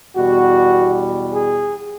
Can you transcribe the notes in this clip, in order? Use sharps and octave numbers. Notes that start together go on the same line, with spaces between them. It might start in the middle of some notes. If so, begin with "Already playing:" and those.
E2 B2 G3 F#4
G#4